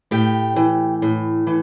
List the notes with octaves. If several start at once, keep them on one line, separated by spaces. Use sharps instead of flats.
A2 G4 G5
E3
A2
E3